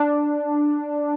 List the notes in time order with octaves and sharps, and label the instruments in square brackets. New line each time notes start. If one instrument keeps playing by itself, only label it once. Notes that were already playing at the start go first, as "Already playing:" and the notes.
Already playing: [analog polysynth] D4